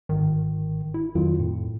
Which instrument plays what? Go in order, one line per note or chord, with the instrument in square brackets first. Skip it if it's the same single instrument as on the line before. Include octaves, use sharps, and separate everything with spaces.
[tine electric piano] G1 G#2 [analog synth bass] D#3
[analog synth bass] E4
[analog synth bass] F2 [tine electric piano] D#3 F#3 F4
[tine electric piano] A2